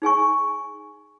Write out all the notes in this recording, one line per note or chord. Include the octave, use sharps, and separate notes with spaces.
D#4 G#4 G#5 C#6